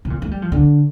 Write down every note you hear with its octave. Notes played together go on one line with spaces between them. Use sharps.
C3
A#2
A3
G3
F3
D3